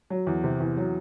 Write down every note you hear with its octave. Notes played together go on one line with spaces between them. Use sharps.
F#3
E2
C3
E2
F#3